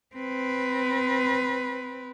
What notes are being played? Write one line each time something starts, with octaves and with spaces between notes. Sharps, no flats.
C4 B4